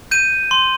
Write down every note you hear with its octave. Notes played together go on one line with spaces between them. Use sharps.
G6 D#7
C6